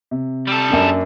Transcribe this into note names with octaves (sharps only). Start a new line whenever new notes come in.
C3
G3 A4
F#2 A#3 D4